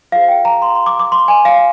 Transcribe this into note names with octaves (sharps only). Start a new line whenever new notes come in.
F4 G#4 C5 F5
G5
A#5
C6
C6
D6
D6
C6
G#5
F5